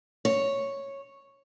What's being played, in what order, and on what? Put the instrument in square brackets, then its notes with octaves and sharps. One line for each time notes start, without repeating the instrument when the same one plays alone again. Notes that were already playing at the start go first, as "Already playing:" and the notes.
[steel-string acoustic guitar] C#5